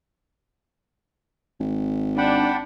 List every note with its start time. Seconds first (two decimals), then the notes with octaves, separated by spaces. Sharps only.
1.60 G#1
2.18 D4 F#5 G5 B5